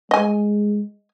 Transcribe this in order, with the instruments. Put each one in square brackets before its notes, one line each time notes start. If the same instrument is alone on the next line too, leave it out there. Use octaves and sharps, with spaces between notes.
[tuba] G#3 [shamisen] D#5 G#5